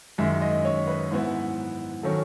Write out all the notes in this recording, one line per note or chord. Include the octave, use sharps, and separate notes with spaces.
F#2 D#3 G#3 E5
D#5
C#5
B4
G#2 E3 B3 E4
D#3 F#3 C#4 A4